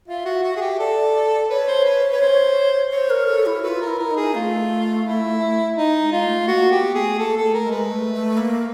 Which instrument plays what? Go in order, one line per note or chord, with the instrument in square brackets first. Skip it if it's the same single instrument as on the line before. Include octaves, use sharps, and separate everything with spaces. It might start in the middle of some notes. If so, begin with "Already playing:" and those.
[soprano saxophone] F4 [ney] E5
[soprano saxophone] F#4
F#4
G#4
G4
[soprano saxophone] A4 [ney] D5
[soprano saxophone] B4 [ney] C#5
[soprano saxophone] C5
B4
B4
C5
[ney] C5 [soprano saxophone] C#5
[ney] A#4
A4
E4
[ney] F4 F#4 [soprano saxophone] B4
[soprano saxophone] A#4
[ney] E4
[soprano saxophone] A#4
[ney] D#4
[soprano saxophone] G#4
[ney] A3 [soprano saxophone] F4
[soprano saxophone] E4
D#4
[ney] G#3
[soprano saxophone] F4
[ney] A3
A3
[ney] A#3 [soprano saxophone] F#4
[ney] B3 [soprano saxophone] G4
[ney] A3 [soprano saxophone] G#4
[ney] A#3 [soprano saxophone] A4
[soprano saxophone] A4
[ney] A3
[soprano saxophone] A#4
[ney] G#3
[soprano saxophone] B4
[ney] A3
A3
A#3